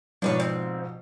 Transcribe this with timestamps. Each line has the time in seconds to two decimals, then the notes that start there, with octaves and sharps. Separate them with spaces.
0.22 G#2 B2 F3 D4 B4 C#5
0.40 C4